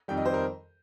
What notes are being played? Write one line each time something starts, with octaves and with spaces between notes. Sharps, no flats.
F2 D#3 G3 G5
D#5
C5
A#4